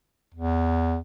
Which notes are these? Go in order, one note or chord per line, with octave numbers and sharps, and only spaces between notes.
E2